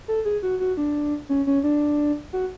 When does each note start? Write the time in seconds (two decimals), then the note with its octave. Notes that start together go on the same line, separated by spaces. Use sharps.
0.08 A4
0.25 G#4
0.43 F#4
0.60 F#4
0.77 D4
1.29 C#4
1.47 C#4
1.64 D4
2.33 F#4